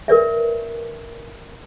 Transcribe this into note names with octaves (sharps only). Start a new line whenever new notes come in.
A#4 B4 D5 E5